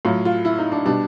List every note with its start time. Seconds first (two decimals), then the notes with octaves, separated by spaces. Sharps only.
0.05 A2 F#3 F4
0.25 F4
0.45 E4
0.58 D#4
0.72 D4
0.85 B2 G3 D4